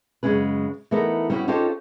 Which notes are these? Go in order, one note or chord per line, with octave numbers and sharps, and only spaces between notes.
F#2 C#3 E3 G#3 C#4 B4
E3 A3 B3 D#4 A4 A#4
G3 B3 C#4 D4 E4 F#4
C#4 D#4 F4 G4 A4 C5